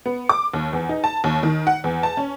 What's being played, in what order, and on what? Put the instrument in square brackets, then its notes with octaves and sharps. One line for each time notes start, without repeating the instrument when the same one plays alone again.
[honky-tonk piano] B3
D6
D#2
E2
D#4
A5
D#2
D#3
F#5
E2
A5
C#4